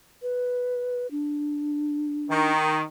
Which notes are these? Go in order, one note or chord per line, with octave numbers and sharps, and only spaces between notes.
B4
D4
D#3